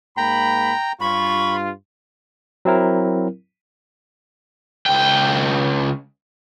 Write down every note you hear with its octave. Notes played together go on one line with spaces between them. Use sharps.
G#2 A#3 G5 A#5 B5
G2 F4 B5 C#6
F#3 C4 E4 A#4
C#2 G5